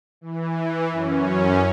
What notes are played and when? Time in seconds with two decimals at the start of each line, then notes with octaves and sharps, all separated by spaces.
0.21 E3
0.91 F#2 C#4